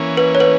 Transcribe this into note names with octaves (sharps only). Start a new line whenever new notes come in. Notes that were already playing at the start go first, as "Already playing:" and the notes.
Already playing: E3 A#3 C#4
B4
C#5
B4